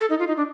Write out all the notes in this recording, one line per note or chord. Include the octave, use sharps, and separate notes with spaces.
A4
D#4
F4
D#4
D4